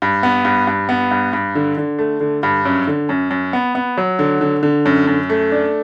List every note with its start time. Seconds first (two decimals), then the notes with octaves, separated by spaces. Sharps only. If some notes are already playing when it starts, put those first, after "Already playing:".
0.02 G2
0.23 B3
0.45 G2
0.67 G2
0.89 B3
1.11 G2
1.33 G2
1.55 D3
1.78 D3
1.99 A3
2.21 D3
2.43 G2
2.65 F#2
2.87 D3
3.09 F#2
3.31 F#2
3.53 B3
3.75 B3
3.97 F#3
4.19 D3
4.41 D3
4.63 D3
4.85 F#2
5.07 F#2
5.30 A3
5.52 D4